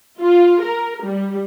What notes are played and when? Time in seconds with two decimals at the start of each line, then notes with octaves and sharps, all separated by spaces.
0.19 F4
0.62 A#4
1.04 G3